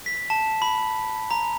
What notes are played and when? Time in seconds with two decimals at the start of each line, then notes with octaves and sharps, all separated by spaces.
0.06 B6
0.30 A5
0.62 B5
1.31 A#5